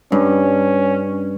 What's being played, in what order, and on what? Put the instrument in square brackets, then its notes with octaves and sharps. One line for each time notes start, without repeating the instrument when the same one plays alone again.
[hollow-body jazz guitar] G2 [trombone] C#4